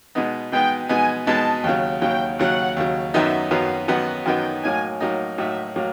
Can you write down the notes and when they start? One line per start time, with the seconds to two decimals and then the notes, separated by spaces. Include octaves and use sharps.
0.15 B2 G#3 B3 D#4
0.52 B2 G#3 B3 D#4 G5
0.89 B2 G#3 B3 D#4 G#5
1.26 B2 G#3 B3 D#4 A5
1.64 D#2 C#3 F#3
2.01 D#2 C#3 F#3 G5
2.39 D#2 C#3 F#3 F#5
2.77 D#2 C#3 F#3
3.14 F#2 D#3 F#3 B3 D#4 E5
3.51 F#2 D#3 F#3 B3 D#4 F5
3.88 F#2 D#3 F#3 B3 D#4 F#5
4.26 F#2 D#3 F#3 B3 D#4 G5
4.63 A2 F#3 A#3 D#4 G#5
5.01 A2 F#3 A#3 D#4
5.38 A2 F#3 A#3 D#4 E5
5.76 A2 F#3 A#3